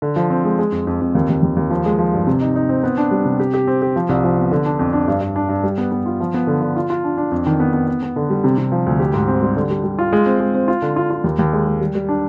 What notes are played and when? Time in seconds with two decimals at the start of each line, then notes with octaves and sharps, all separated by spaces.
0.02 D3
0.16 F3
0.30 C4
0.44 G#3
0.59 G#3
0.72 F2
0.87 F2
1.01 F2
1.15 D#2
1.29 D#2
1.43 D#2
1.56 D#2
1.70 F3
1.85 G#3
1.99 F3
2.14 G2
2.27 C3
2.41 D#4
2.56 D#4
2.69 C4
2.83 B3
2.97 D4
3.11 G3
3.25 C3
3.40 G4
3.54 G4
3.67 C4
3.82 G4
3.96 F3
4.09 C2
4.24 F3
4.38 B3
4.51 D3
4.66 D4
4.79 F2
4.93 D4
5.08 G2
5.21 G2
5.36 D4
5.49 G2
5.63 G3
5.78 B3
5.92 B3
6.06 F4
6.20 F3
6.34 B3
6.47 D3
6.62 D3
6.76 F4
6.90 F4
7.04 D4
7.17 D4
7.31 F2
7.46 D#3
7.60 B3
7.73 B3
7.88 B3
8.03 B3
8.16 D3
8.30 G3
8.44 C3
8.58 C3
8.72 F3
8.86 D2
9.00 G4
9.14 G#2
9.28 C4
9.42 G3
9.56 D3
9.70 G3
9.84 G3
9.99 F4
10.13 G#3
10.26 C4
10.40 G#3
10.55 C4
10.68 F4
10.82 D3
10.96 F4
11.11 F4
11.24 D#2
11.39 D#2
11.53 G#3
11.67 G#3
11.80 G3
11.95 G3
12.09 D4